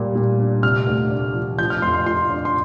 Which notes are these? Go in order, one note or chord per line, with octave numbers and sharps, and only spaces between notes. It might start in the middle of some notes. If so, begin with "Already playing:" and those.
Already playing: A#2 G3
A#2
D4
C3 F6
D2
D4
F3
F3 G6
F6
F2 C6
C6
F4 C6
D4
C6